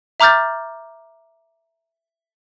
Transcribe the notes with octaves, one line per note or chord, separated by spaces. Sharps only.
E5 A#5 D6 F6 G6 A6